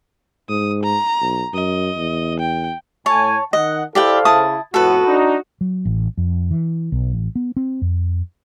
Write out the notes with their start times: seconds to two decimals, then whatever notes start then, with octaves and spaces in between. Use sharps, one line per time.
0.49 G#2 D#6
0.83 A#5
1.21 B1
1.54 F#2 D#5
1.96 E2
2.40 G5
3.06 A2 C#5 G#5 A5
3.53 D#3 D#5 F#5
3.95 E4 G4 A4 C5 D5 F5 G5
4.25 C#3 E4 A5 D#6
4.74 F2 A2 B3 F#4 A4 B4
5.05 D4 D#4
5.61 F#3
5.85 A1
6.17 F2
6.51 E3
6.92 B1
7.13 A1
7.35 B3
7.56 C4
7.82 F2